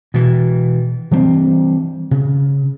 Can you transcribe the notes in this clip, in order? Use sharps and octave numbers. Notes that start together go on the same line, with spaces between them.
B2 E3
E3 G3 G#3 C4
C#3